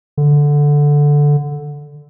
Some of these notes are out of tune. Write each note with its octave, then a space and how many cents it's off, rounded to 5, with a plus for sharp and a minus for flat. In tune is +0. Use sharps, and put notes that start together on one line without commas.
D3 -5